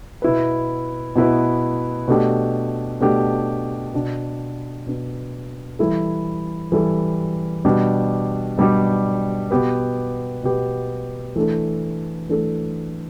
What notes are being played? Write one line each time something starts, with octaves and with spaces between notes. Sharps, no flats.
B2 B3 E4 B4
B2 B3 E4 B4
B2 A3 D4 G4
B2 A3 D4 G4
B2 B3 D4
B2 B3 D4
E3 G3 E4 A4
E3 G3 E4 A4
B2 G3 D4 G4
B2 G3 D4 G4
B2 B3 G4 B4
B2 B3 G4 B4
E3 A3 D4 A4
E3 A3 D4 A4